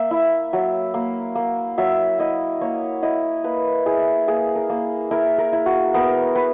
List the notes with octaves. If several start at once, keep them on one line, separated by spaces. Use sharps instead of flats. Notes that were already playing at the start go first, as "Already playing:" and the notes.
Already playing: A#3 E5
E4
F#3
A#3
A#3
F#3 E5
E4 D#5
A#3 C#5
E4 D#5
A#3 B4
E4 G#4
A#3 G#4
A#4
A#3
E4 A#4
A#4
E4
F#4
B3 A#4
B3 B4